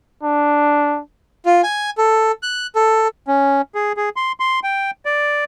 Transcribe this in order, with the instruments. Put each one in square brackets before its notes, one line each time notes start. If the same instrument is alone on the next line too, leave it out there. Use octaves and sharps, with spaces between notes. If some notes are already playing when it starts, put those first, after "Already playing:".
[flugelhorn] D4
[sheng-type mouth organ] F4
G#5
A4
F#6
A4
[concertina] C#4
G#4
G#4
C6
C6
G5
D5